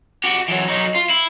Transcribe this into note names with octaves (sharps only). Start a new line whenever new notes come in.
F#4 G4
E3 F#3
F#3 D#4
F4
E4